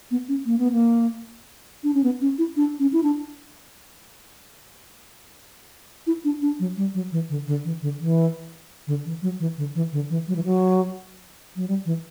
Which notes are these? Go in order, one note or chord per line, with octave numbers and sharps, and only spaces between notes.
B3
C#4
A#3
B3
A#3
D4
C#4
B3
C#4
E4
D4
C#4
E4
D4
E4
D4
D4
F#3
G3
F#3
E3
D3
D3
E3
D3
E3
D3
E3
F#3
E3
D3
E3
D3
E3
F#3
E3
F#3
F#3
G3
E3